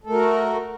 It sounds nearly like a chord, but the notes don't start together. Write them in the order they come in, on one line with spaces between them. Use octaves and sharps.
A4 A3 A#4 F#4